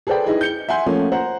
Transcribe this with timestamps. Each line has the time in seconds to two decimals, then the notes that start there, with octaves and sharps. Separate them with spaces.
0.07 G#4 A4 B4 C5 D5 G5
0.26 D#4 E4 G#4 B4 D#5
0.41 G6 C#7 G7
0.69 E5 F#5 G#5 C6 G6
0.86 F3 A3 A#3 C#4
1.12 C5 F#5 A#5